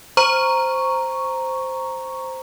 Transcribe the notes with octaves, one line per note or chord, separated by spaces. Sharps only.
C5 A#5 C#6